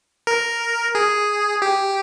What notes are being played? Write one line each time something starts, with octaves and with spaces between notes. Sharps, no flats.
A#4
G#4
G4